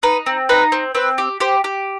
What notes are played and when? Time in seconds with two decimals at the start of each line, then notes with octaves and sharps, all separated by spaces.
0.03 D#4 B4
0.26 C4
0.49 D#4 B4
0.72 C4
0.95 C4 B4
1.18 G4
1.40 G4 C5
1.64 G4